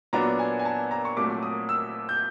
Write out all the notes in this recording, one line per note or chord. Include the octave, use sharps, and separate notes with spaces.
A#2 F#3 B3 D4 A#5
G#5
G#5
A5
A#5
C#6
C2 A#2 F#3 A3 D6
D#6
E6
G6